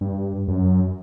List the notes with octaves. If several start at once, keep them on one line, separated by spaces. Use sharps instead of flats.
G2
F#2